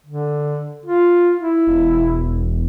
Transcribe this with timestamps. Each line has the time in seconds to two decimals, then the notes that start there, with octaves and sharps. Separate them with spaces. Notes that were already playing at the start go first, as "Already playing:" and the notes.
0.06 D3
0.86 F4
1.39 E4
1.67 E1